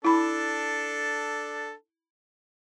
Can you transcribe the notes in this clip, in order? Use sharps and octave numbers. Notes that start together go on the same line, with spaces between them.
D4 E4 A4 B5